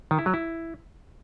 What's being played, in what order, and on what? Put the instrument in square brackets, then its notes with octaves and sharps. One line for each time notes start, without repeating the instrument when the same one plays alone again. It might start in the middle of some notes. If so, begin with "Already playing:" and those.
[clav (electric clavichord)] D#3
E4
F#3
E4